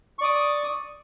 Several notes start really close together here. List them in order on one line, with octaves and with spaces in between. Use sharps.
C#6 D5 D#6